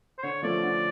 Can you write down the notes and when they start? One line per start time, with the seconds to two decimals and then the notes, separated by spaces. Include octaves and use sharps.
0.19 C5
0.23 D3 C#5
0.43 F3 A3 C#4 D5
0.62 D3